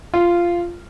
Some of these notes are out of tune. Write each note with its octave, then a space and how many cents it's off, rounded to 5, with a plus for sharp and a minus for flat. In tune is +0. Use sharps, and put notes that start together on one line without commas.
F4 -10